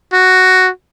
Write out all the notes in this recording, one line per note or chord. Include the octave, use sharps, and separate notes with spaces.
F#4